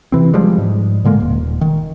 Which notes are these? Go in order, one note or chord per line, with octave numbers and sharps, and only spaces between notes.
C3 E3 C4
F3 G3 G#3
G#2
A#2 D3 G#3 A#3
D#1
D#3